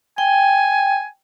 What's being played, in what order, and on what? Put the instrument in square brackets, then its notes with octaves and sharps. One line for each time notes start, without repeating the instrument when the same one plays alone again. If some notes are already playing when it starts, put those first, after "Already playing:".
[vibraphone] G5 [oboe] G#5